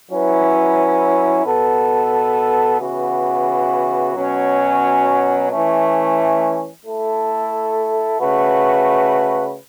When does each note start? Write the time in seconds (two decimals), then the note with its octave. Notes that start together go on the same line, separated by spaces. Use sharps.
0.11 F#3 C#4 E4 B4
1.45 B2 B3 A4
2.80 C#3 E3 B3 F#4
4.15 B2 F#3 C#4
5.50 E3 A3 C#4
6.85 A3 E4 A4
8.20 C#3 A3 F#4 B4